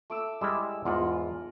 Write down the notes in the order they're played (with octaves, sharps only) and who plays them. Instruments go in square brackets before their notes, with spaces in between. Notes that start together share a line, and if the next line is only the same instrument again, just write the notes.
[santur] A3 D6 E6
[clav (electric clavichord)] G3 G#3 E4 [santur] E6
[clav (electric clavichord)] E2 G#2 [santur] F4 A#4 F#5